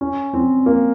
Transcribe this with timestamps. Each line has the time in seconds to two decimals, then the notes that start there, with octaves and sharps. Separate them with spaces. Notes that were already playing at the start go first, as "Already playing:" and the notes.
0.01 C#4
0.33 C4
0.66 A#3